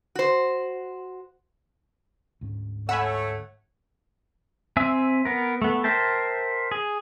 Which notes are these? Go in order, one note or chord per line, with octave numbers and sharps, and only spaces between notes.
F#4 C5
D2 G#2 C#4
A3 C#5 F#5 G#5 B5 E6
C4 E5 G#5 E6
B3 A#4
A3 B3
A#4 C5 E5 G5 A5
G#4